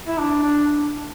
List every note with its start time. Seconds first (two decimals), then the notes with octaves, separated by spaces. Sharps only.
0.08 E4
0.19 D4
0.43 D4